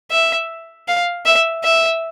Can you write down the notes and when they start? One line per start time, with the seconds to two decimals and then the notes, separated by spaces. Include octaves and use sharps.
0.11 E5
0.88 F5
1.26 E5
1.64 E5